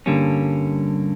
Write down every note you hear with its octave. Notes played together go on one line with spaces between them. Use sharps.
G2 D3 G3 A#3 C#4